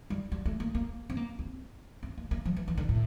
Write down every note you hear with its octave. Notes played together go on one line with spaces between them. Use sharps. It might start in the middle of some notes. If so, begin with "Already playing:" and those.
G3
G3
A3
A#3
A#3
C4
A#3
C4
C4
A#3
A#3
F3
E3
E3
D3
A2